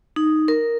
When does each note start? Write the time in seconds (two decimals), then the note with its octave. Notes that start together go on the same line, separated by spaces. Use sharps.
0.16 D#4
0.48 A#4